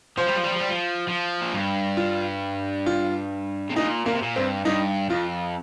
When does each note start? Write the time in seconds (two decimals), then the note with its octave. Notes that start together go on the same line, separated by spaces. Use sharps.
0.17 F3 C5
0.27 G3
0.35 F3
0.44 G3
0.52 F3
0.60 G3
0.69 F3
1.08 F3
1.41 A#2
1.53 G2
1.97 F4
2.86 F4
3.70 C3
3.76 A#2 D#4
4.06 A#2 A#3
4.14 C3
4.22 A#2
4.36 G2 C4
4.65 G2 D#4
5.10 F2 F4